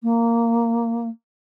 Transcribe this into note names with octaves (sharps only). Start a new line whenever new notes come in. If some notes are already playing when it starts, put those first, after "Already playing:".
A#3